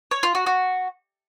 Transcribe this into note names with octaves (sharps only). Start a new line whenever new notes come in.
C#5
F4
F#4
F#4